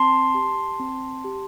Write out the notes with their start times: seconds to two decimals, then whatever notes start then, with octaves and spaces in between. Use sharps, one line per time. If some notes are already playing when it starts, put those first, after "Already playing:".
Already playing: C4 A5 C6
0.35 G4
0.80 C4
1.24 G4